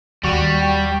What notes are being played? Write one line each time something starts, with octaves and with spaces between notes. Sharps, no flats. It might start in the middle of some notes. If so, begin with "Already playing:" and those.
D#2 G3 F#4 C#6
G5